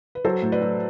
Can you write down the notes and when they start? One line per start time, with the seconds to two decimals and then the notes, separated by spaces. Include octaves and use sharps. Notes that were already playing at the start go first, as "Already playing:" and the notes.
0.15 B4
0.25 F#3 A4 C5
0.42 A2
0.52 B4 D5
0.61 F#3